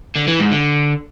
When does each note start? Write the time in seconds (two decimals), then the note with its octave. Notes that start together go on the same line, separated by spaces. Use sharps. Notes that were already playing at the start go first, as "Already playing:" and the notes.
0.16 D3
0.27 E3
0.39 G#2
0.51 D3